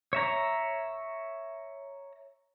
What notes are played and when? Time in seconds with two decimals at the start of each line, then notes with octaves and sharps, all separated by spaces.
0.13 C#5 E5 A#5